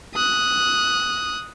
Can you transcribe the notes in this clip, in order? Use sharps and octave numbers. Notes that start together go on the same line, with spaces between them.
D#6 F#6